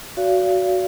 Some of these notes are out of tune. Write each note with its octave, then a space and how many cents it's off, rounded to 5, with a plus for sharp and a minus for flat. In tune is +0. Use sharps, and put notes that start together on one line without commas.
F#4 +0 D5 -40 F5 -30